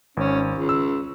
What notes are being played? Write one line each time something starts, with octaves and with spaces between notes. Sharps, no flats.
G#1 C#4
C#2
E6